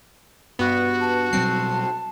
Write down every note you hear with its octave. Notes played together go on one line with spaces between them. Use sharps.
G2 B3 F#4
A5
B2 F#3 G3 C4 C7